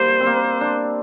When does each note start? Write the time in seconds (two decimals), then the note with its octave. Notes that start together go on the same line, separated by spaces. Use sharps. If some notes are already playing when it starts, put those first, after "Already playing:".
Already playing: G3 A#3 C5
0.20 C4
0.26 A#3
0.61 D4